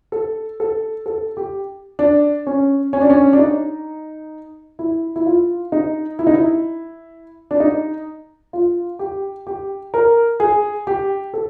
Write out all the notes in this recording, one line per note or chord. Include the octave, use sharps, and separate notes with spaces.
A4
A4
A4
G4
D4
C#4
C#4
D4
C#4
D4
D#4
E4
E4
F4
D#4
E4
D#4
E4
D4
D#4
F4
G4
G4
A#4
G#4
G4
A4